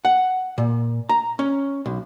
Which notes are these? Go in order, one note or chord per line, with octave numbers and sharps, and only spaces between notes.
F#5
A#2
A#5
C#4
B1